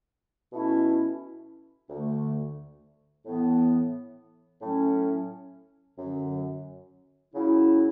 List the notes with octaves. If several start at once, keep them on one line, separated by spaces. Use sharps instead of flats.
B2 A3 C#4 E4
D2 D3 A3
A2 E3 B3
A2 F#3 C#4
F#2 D3 F#3
C#3 F#3 C#4 E4